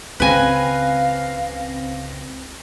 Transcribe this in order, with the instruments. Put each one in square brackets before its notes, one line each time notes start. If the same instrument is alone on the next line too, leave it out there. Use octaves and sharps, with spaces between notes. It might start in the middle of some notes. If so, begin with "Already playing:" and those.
[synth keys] C#2 C4 A#6 [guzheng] B4 G#5 [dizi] F5